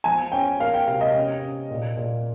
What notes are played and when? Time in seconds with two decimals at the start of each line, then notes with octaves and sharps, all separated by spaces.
0.04 F3 G#5
0.32 C#4 G5
0.60 A#3 F5
0.74 G5
0.87 C3 F5
1.01 D#5
1.14 C#4
1.42 C#4
1.71 A#2
1.97 A#2